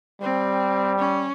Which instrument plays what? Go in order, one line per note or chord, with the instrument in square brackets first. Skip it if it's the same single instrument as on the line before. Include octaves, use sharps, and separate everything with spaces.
[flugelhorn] G3 [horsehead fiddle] C4
[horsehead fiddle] C#4